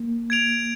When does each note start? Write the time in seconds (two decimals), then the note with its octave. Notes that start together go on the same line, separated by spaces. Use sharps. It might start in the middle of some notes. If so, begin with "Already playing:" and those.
Already playing: A#3
0.30 G#6 D7 F7